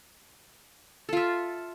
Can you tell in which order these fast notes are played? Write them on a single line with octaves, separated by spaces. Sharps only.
A4 F4 E5